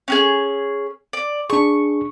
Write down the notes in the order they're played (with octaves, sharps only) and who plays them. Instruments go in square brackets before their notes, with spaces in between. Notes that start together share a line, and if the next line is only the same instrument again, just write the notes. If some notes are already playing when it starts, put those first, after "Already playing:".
[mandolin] C#4 F#4 G#4
D5
[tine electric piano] D4 G#4 [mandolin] C#6